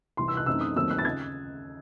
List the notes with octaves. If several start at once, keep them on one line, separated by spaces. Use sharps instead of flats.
C2 C3 E3 C6
E6
F#6
F#2 E3 A3 C4 D#4 E6
D#6
D#2 D#3 F#3 A3 C4 E6
F#6
A6
C#3 G#6